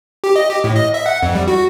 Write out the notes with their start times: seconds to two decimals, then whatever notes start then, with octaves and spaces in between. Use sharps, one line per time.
0.24 G4
0.36 D#5
0.50 G4
0.64 A2
0.76 D#5
0.94 E5
1.06 F#5
1.23 F2
1.35 G3
1.48 F#4